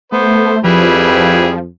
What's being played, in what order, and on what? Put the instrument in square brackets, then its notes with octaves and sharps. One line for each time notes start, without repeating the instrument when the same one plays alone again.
[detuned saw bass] A3 [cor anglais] B3 [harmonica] C5
[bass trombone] F2 [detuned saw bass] F3 [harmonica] G3 E4 G#4 [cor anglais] B4